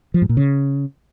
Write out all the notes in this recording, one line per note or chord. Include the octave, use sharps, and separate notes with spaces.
F3
G#2
A#2
C#3